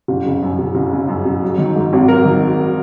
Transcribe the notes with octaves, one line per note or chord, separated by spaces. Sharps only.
F#1
C#3
F#2
F#1
F#1
C#3
F#2
F#1
F#3
D#3
G#2
G#1
F#3 A#4
D#3